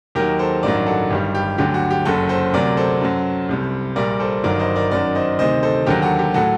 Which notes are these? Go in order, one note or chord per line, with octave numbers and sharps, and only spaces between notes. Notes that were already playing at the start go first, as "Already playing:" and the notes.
D#2 D#3 F#3 G4 A#4
A4 C5
A1 G2 D#3 F#3 A#4 D5
F#4 A4
G1 G2 D#3 G3 G4
G4
D2 D3 F#3 G4
F#4
G4
F#1 F#2 F#3 F#4 A4
A4 C5
D2 C3 F#3 A#4 D5
A4 C5
F#2 F#3
C2 C3 G3
A#1 A#2 G3 A#4 D5
A4 C5
G1 G2 D#3 F#3 A#4 D5
C5 D#5
A#4 D5
F#2 D#3 F#3 A#4 D5
C5 D#5
D2 C3 D#3 C5 D#5
A4 C5
D#2 D3 F#3 G4 A#4
F#4 A4
G4
A2 F#3 F#4 A4